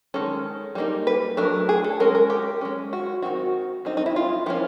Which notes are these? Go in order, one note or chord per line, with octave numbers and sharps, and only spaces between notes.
D#3 G#3 C#4 A4
G3 A#3 D#4
B4
F#3 A3 D4 A#4
G#4
A4
G#3 C#4 A#4
A#4
G4
G#3 C#4
F#4
D#3 G#3 C4 D#4 F#4
G3 C4 D#4
D#4
E4
F4
F3 A#3 C#4 E4